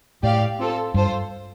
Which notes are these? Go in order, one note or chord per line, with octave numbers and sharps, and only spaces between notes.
A2 G4 D5 F5
C4 F4 A4
G2 F4 A4 C5